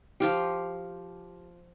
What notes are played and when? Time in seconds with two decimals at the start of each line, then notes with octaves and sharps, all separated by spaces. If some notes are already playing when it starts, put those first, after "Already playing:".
0.20 F3 F4 G4